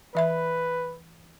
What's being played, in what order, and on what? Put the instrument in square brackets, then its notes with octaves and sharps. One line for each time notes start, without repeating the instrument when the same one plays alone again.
[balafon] E3 E5 B5 [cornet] B4